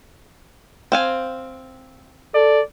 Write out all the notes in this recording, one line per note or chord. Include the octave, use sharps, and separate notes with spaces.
C4 F5 G#5
A4 D5